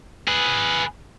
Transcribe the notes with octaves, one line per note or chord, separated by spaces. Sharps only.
G#4 B4